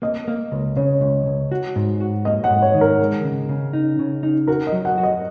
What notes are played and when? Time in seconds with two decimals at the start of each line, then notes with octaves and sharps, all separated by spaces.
0.02 A#3 D#5
0.28 A#3
0.52 C#2
0.76 C#3 C#5
1.01 C#2
1.26 C#2
1.52 F#4
1.76 G#2
2.00 F#4
2.25 A#3 D#5
2.44 F#5
2.50 G#2
2.62 C#5
2.74 D#3
2.81 A#4
3.00 G#3
3.24 C#3
3.49 C#3
3.73 D#4
3.99 C#3
4.23 D#4
4.48 F#4 A#4
4.67 D#5
4.72 F#3
4.85 F#5
4.98 F#4
5.03 D#5